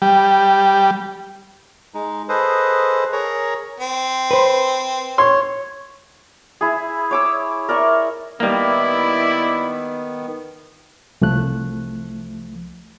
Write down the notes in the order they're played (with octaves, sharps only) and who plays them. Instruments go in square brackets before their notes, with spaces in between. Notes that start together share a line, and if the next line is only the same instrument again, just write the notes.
[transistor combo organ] G3
[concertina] G#3 D#4
G#4 A4 B4 C5 D#5
G#4 A#4 C#5 A#5
[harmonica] C4
[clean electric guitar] B4 C5
[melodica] C#5 [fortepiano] C6
[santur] E4 G#4
C#5 D6 E6
A#4 D5 E5 C#6
[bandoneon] D#3 B3 [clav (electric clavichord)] G3 A#3 [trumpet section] E4 D5
[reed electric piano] C2 F3 A3 F#6